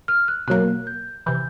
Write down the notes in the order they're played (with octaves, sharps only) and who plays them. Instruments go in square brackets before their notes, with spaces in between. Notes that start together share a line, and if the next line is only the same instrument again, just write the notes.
[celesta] F6
F#6
[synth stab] B2 F#3 A#3 [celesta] F#6
[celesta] G6
[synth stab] C3 E3 [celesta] G6